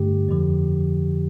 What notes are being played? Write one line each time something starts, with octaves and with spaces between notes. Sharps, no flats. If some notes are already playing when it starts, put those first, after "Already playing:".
Already playing: G2 D3 A3 G4
F2 D3 F3